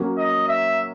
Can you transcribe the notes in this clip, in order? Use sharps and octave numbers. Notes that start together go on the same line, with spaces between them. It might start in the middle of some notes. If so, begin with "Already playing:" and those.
Already playing: F#3 A#3 C#4
D#5
E5